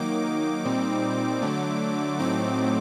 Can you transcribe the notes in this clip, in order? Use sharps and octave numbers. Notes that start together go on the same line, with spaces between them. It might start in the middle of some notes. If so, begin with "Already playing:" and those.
Already playing: D#3 F#3 A#3 D#4 D6
A#2 G3 C4 D#4
D3 F#3 A3
A2 F#3 A3 C4 D#4 D6